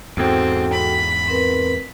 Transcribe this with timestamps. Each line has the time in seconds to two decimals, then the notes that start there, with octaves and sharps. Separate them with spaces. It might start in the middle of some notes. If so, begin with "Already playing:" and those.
0.17 E2 G#2 C4 F#4 A4 G5
0.73 B5
1.28 C4 A#4 B4